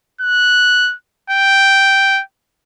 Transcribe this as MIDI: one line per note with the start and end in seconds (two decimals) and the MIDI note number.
0.21 0.95 90
1.30 2.22 79